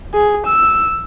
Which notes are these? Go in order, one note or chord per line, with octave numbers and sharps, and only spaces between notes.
G#4
E6